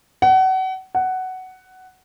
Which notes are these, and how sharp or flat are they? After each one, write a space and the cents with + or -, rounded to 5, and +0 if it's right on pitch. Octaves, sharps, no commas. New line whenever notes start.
F#5 +30
F#5 +10